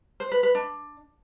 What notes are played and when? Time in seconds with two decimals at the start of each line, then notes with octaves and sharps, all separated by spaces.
0.20 C5
0.32 B4
0.43 B4
0.55 D4